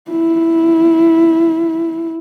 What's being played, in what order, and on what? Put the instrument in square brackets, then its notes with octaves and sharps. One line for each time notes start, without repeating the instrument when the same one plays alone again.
[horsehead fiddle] E4